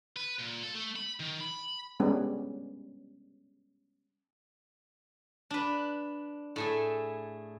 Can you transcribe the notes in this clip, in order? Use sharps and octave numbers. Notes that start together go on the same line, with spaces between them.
B4
A#2
A4
A3
B5
D#3
B5
G3 G#3 B3 C#4 D4
D4 B4
A2 A3 G#4